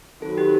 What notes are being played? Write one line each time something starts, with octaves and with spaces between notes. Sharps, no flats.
D#3 F#3 C4 F#4 A4 B4
G4